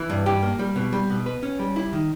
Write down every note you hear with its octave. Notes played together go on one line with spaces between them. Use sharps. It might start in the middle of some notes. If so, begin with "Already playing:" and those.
Already playing: E3
G2
G4
A#3
G3
B2
G3
B2
B4
C#4
G3
E4
D#3